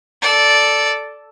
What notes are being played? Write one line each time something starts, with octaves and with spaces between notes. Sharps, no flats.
A4 D5